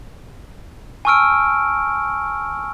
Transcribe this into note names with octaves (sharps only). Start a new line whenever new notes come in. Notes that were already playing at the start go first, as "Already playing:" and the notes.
G#5 A5 C#6 E6 F6 D7